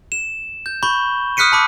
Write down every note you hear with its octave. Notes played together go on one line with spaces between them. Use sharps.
E7
G6
B5 C#6 G6 G7
D#6 F6 F#6 B6 C#7 D#7
A5 B5 D6